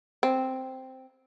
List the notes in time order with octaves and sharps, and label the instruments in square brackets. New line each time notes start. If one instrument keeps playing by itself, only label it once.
[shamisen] C4